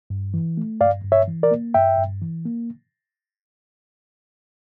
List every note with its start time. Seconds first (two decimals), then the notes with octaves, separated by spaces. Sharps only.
0.10 G2
0.34 E3
0.57 A3
0.81 G2 D5 F5
1.04 G2
1.12 C#5 E5
1.27 E3
1.43 A#4 D5
1.51 A#3
1.74 G2 E5 G5
1.98 G2
2.22 E3
2.45 A#3